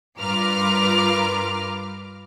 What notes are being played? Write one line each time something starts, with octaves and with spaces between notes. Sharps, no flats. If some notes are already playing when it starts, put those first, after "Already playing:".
G2 F4 A#4 B4 D6 F6